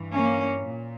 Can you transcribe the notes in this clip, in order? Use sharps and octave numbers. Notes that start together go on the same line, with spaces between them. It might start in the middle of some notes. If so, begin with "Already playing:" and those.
Already playing: G2 E3
A#3 C#4
A#2